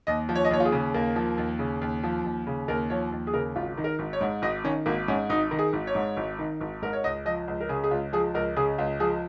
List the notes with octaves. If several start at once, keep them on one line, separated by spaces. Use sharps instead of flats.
D#2 D#5
F3
C#5
D#5
D#2 C#5
F4
G#4
C#3
D#2 A#3
F3
D#2
C#3
D#2
F3
D#2
C#3
D#2 A#4
F3 C#5
D#2
G#4
C#3 A#4
G#1 F4
D#3
A#4
G#1
C#5
G#2
G#1 D#5
D#3 C#4
G#1 A#3
G#2 C#4
G#1 D#4
D#3
G#4
G#1
C#5
G#2
G#1
D#3
G#1
G#2 A#4
C#5
C#2 D#5
F3 D#5
C#2
A#4
C#3 G#4
G#4
C#2 F4
F3 G#4
C#2 A#4
C#3 G#4
C#2 F4
F3 G#4